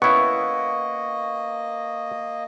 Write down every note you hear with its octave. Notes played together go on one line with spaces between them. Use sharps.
A#3 B3 C#4 E4 D#5 C#6